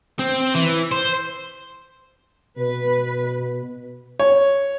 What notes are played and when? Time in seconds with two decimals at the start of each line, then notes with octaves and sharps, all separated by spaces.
0.19 C4
0.54 E3
0.92 C5
2.58 B2 B4
4.20 C#5